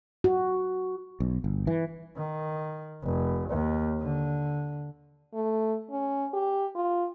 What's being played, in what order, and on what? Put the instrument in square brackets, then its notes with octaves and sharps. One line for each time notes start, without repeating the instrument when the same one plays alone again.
[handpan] F#4
[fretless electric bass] B1
G1
E3
[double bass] D#3
F1
D#2
D3
[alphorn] A3
C#4
G4
F4